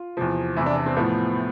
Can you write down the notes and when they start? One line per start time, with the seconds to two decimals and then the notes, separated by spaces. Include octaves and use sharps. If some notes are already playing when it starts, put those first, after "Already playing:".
Already playing: F4
0.17 E2 C3 F3
0.56 E2 C3 E3 E4
0.66 D4
0.76 D4
0.86 C4
0.96 A2 F3 B3